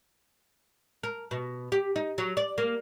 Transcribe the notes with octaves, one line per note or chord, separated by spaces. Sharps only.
A#4
B2
G4
D#4
F#3
D5
A#3